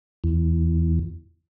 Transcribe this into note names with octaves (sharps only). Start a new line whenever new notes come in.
E2